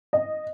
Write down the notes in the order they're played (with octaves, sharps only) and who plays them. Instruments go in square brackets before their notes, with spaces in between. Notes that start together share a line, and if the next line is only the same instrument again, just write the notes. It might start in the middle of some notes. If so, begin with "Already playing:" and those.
[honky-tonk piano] D#5